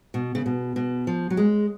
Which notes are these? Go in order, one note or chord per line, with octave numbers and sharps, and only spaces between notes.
B2
C#3
B2
B2
F3
F#3
G#3